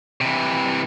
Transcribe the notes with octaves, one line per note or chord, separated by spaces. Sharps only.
C3 E3